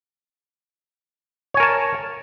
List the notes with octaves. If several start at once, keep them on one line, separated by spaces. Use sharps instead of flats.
A#4 C#5 G#5 A5